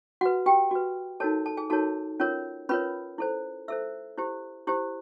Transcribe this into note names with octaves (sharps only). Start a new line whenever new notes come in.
F#4 B4 F#5
G4 G5
F#4 B4
D#4 F#4 A4 A#4 C#5 A5
A4 A5
G#4 G#5
D#4 F#4 A4 A#4 C#5 A5
C#4 F4 A#4 C#5
C#4 F4 A#4 B4 C#5 B5
E4 A4 C5
E4 A4 C5 E5 E6
E4 G4 C5
E4 G4 C5